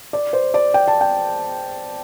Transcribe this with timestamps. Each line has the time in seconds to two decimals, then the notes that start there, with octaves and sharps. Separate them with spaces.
0.13 D5
0.33 C5
0.54 D5
0.74 G5
0.88 A5
1.01 G5